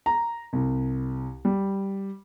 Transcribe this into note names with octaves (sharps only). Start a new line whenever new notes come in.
A#5
C2
G3